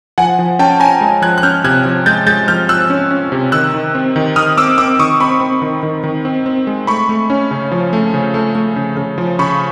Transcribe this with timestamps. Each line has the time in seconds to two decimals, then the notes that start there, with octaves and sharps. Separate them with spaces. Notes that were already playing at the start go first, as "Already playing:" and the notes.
0.18 F3 F#5 G#5
0.39 F3
0.59 C#4 G5 A5
0.80 C#4 G#5 A#5
1.01 G#3
1.22 F3 F#6 G#6
1.38 F#6
1.43 C#4 F6 G6
1.64 C3 F#6 G#6
1.85 F3
2.06 G#3 G6 A6
2.26 G#3 G6 A6
2.48 F3 F6 G6
2.69 F3 E6 F#6
2.90 C#4
3.11 C#4
3.32 C3
3.52 D#3 E6 F#6
3.74 D#3
3.95 C4
4.16 D#3
4.36 D#3 D#6 F6
4.57 C4 D6 E6
4.78 C4 D6 E6
4.99 D#3 C#6 D#6
5.20 C4 B5 C#6
5.41 C4
5.62 D#3
5.83 D#3
6.04 D#3
6.25 C4
6.46 C4
6.67 G#3
6.87 A3 B5 C#6
7.09 A3
7.30 C#4
7.51 C#3
7.72 F3
7.93 A3
8.14 C#3
8.34 A3
8.55 A3
8.76 C#3
8.97 C#3
9.18 F3
9.39 C#3 B5 C#6